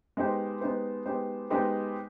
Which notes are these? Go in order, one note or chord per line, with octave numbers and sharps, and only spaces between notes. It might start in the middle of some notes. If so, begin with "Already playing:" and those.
G#3 B3 D#4 G4 C5
G#3 B3 D#4 G4 C5
G#3 B3 D#4 G4 C5
G#3 B3 D#4 G4 C5